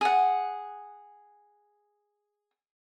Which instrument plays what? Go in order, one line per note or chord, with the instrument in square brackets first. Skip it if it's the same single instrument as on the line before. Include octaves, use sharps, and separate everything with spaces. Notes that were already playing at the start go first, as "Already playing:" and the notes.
[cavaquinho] G#4 F#5